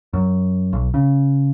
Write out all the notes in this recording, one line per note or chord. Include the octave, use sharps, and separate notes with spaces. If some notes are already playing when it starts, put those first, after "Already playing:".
F#2
B1
C#3